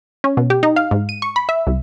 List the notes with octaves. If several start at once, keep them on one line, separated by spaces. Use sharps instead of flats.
C#4
B2
G4
D#4
F5
G#2
D#7
C#6
B5
E5
C2